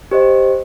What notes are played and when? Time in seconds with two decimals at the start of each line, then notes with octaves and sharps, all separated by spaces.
0.11 G4 C5 D#5